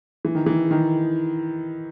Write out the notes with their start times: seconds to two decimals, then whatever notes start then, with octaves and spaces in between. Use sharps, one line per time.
0.25 E3
0.35 D#3
0.46 E3
0.71 D#3